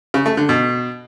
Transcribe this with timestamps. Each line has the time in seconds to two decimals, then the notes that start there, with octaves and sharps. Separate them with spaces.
0.14 C#3
0.26 A3
0.37 D3
0.49 B2